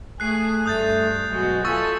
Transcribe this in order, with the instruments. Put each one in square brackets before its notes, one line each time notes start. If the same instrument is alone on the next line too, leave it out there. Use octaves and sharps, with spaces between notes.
[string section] A3 G#4 A4 [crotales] F#6 C7
[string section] G2 [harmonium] A3 [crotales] D#6 G6 A6
[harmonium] B2 [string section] F#3 G#3 F#4
[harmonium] F4 [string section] A4 E5 G#5 [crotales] C#6 E6 A6